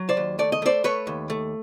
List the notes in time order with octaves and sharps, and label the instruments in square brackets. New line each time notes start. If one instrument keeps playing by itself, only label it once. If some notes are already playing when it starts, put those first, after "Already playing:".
Already playing: [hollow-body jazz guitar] F#3
C5 D5
D#2
A3 D5
D#5
A3 C5 D5
A3 B4 C#5
D#2
A3